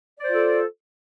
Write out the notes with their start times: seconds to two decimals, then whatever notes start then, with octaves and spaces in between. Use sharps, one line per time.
0.19 D5
0.24 C5
0.29 F4
0.34 A4